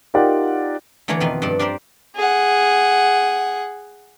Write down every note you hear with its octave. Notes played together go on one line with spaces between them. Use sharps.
D#4 F4 G4 A#4 D5 F#5
D3 E3 A3 A#3 C#5 A#5
F2 B2 D#3 B4 C6
G2 F3 A4 D5 A5
D4 G4 A#4 C5 D5
G#4 F#5